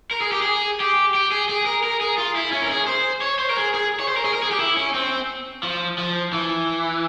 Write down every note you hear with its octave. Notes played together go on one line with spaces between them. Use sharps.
A#4
G#4
G4
G#4
G4
G4
G#4
G#4
A#4
A#4
G#4
F4
E4
C#4
A#4
G#4
C5
C#5
C5
A#4
G#4
G#4
C#5
C5
A#4
G#4
A#4
G#4
G4
E4
C#4
C4
F3
F3
E3